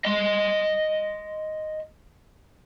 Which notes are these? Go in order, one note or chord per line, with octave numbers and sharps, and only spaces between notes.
D#5 C6